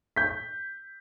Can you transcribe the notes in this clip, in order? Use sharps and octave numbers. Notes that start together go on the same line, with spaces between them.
G6 B6